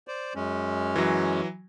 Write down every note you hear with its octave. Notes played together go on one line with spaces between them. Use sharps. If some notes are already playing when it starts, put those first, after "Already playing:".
C5 D5
F#2 G#3 C#4
E3 F#3